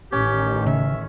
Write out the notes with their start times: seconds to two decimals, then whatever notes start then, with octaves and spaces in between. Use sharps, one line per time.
0.12 A1 D#3 C#4 G4
0.66 C#3 E5